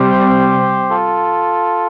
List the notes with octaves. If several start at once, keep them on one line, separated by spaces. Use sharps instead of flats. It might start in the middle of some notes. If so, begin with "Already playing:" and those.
Already playing: C3 G3 C4 G4 C5
F4 A4